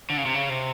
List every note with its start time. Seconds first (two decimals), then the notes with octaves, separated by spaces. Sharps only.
0.10 D3
0.17 C#3
0.25 C3
0.34 C#3
0.49 C3